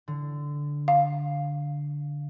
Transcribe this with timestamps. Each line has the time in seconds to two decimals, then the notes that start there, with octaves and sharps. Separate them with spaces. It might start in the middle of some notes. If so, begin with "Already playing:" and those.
0.08 D3
0.88 F5